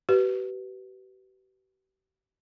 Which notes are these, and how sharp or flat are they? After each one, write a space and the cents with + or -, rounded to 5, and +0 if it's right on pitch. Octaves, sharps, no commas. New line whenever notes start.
G4 -45 B4 +0